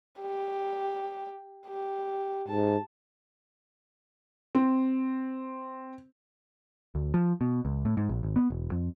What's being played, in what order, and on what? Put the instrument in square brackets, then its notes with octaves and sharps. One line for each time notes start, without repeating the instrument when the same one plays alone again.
[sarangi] G4
G4
[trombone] G#2 [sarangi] A5
[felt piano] C4
[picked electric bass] D2
F3
B2
C#2
A2
G#2
A#1
G#1
B3
E1
F2